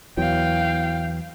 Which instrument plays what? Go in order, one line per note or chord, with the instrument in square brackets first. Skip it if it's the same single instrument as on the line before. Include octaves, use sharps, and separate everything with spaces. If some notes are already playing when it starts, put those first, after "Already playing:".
[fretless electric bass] E2 E3 F#3 [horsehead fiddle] F5 G5